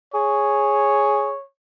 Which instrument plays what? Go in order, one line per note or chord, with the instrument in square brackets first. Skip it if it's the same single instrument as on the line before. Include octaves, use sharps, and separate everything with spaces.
[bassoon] G#4 [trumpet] C#5